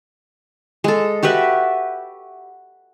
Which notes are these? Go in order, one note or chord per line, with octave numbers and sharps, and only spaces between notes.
G#3 A4
F#4 G4 B4 E5